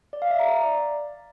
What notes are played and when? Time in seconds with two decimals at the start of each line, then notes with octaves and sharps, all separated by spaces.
0.13 D5
0.22 F5
0.31 E5
0.39 A#5
0.48 D5